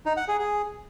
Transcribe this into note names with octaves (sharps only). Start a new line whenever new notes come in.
D#4
F#5
G#4
G#4